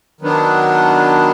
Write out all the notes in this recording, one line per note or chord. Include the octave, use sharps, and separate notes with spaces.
D#3 F#3 B3 D4